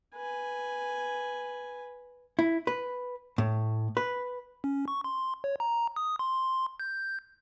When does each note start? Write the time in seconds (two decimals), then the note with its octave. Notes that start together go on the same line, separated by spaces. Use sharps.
0.16 B4 G#5
2.39 E4
2.67 B4
3.38 A2
3.97 B4
4.64 C#4
4.88 C#6
5.04 C6
5.44 C#5
5.60 A#5
5.96 D#6
6.19 C6
6.80 G6